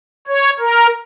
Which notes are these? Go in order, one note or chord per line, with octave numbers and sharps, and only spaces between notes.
C#5
A#4